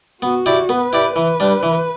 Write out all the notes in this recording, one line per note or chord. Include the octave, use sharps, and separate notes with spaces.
B3 F#4
E4 G4 D5
B3 B4
E4 G4 D5
E3 B4
G3 D4
E3